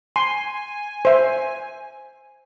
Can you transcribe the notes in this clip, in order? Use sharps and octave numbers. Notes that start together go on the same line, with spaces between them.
G#5 C6
C5 E5